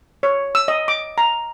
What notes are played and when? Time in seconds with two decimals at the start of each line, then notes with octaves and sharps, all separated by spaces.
0.23 C#5
0.55 E6
0.68 D#5
0.88 D6
1.18 A#5